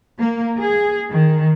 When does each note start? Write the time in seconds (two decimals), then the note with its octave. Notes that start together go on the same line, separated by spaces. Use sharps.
0.19 A#3
0.58 G#4
1.12 D#3